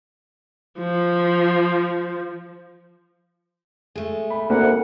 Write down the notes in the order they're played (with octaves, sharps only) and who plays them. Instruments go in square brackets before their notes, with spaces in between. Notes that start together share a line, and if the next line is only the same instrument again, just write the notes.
[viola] F3
[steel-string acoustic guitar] G#3 A3
[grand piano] B5
[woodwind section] D2 G#2 F#5 [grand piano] A#3